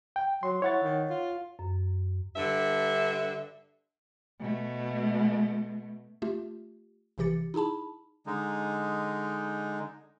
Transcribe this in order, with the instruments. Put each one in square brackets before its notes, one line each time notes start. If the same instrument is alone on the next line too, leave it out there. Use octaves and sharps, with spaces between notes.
[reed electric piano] G5
[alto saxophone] F#3 [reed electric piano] C6
[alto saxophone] E4 [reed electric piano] C#5 F#5 A6
[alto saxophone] D#3
F4
[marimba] F#2
[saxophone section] G2 D3 E5
[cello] B2 A3
[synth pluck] A3 F4 G4
A#1 C3 E3 G4 A6 C#7
D#4 E4 G#4 A5 B5
[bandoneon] D3 G#3 D#4